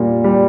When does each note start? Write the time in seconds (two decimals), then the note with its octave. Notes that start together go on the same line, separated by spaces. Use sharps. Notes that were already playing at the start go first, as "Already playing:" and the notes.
Already playing: A#2 G3
0.24 G3